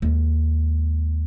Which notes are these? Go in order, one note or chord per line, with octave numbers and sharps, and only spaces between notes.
D#2 G#3